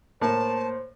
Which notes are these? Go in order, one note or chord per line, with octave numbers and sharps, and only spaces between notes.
A2 A#3 C5 A5